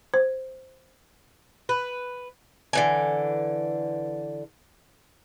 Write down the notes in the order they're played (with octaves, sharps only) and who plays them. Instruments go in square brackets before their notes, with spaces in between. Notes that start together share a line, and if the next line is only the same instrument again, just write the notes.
[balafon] C5
[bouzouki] B4
D3 E3 G#5